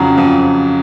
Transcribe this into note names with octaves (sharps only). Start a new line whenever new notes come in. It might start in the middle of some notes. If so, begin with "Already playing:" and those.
Already playing: F2 C#3 F#3
F2